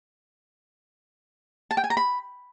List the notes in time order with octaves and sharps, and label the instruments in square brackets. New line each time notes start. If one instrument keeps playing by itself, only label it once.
[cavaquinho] A5
G5
G#5
A#5
B5